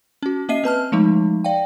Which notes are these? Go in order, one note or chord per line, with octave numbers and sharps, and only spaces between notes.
C#4 F#4
A#3 C#4 D#5 E5 C7 D#7
C4 B4 A5 F6
F3 G#3 A3 D#4
D5 F5 G5